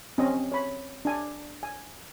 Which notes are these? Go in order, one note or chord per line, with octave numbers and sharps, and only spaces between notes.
C4 C#4 D#5
C#5 B5
D4 G#5
G#5